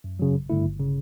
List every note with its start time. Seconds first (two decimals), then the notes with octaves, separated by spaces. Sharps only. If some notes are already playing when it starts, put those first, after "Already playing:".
0.04 F#2
0.19 C#3 F#3
0.34 A1
0.50 G2 D3 A3 E4
0.65 G1
0.80 C#3